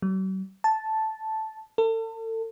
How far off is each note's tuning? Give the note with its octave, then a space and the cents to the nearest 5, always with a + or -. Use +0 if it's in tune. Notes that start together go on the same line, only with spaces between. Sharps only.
F#3 +45
A5 -5
A4 +35